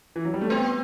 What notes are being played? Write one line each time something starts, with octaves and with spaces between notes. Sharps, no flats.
E3
F#3
G3
A3
B3 C4